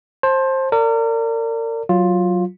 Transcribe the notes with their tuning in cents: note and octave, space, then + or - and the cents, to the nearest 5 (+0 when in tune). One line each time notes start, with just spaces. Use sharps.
C5 +20 A5 +0
A#4 -35 D5 -20
F#3 +5 F4 +10